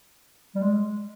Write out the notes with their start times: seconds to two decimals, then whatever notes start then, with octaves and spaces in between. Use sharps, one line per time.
0.55 G3
0.62 G#3